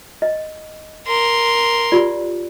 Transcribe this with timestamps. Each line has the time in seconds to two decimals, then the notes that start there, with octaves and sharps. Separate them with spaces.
0.22 D#5
1.07 A#4 C6
1.92 F4 G4 D5